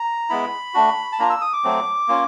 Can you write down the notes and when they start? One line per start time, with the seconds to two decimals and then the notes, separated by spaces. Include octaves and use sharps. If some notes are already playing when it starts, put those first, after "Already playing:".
Already playing: A#5
0.30 G#3 B3 E4 B5
0.74 A3 D4 F#4
1.12 A5
1.19 A#3 D4 F4 A#5
1.30 E6
1.41 D#6
1.53 D6
1.64 F#3 A3 C4
2.08 A#3 C#4 F4